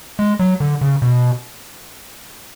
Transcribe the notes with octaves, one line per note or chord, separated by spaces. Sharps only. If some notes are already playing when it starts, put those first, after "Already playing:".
G#3
F#3
D3
C#3
B2